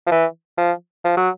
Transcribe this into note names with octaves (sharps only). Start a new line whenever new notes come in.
F3
E3
F3
F3
F#3